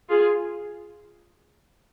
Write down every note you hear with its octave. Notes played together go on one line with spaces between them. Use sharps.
F4 G#4